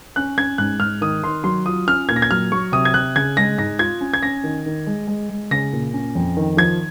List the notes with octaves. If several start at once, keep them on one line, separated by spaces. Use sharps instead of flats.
C#4 F#6
C#4 G#6
G#2 F#6
G#2 F6
D#3 D#6
D#3 C6
F#3 C6
F4 D#6
C#4 F6
A#2 G#6
A#6
G#6
F#3 F6
F#3 C#6
C3 D#6
G#6
C3 F#6
C#3 G#6
G#3 A#6
G#2 A#6
F4 G#6
C#4
G#6
C#4 A#6
D#3
D#3
G#3
G#3
G#3
C#3 A#6
A#2
C#4
F2
D#3
F3 G#6